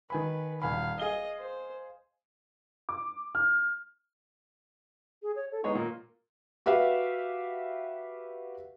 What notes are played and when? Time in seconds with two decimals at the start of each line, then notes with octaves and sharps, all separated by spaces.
0.10 D#3 B4 G#5 B5
0.62 D#1 F5 G#5 B5
1.00 G#4 D#5 F5 G7
1.39 C5
2.89 D6
3.35 F6
5.22 G#4
5.36 C#5
5.52 A4
5.64 G#3 B3 D#4 C#5
5.75 A#2 A#4
6.66 F#4 G4 B4 E5 F5